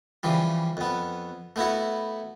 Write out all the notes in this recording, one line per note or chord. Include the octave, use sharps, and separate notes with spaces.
C#3 E3 F3 G3
F2 B3
A3 B3 E4 F#4